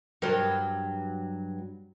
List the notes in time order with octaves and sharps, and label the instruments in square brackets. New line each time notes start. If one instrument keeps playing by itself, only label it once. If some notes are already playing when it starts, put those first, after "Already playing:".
[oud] G2 F#3 [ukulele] A#4